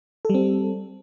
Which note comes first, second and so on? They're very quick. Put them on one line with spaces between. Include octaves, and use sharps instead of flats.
A4 G3 C4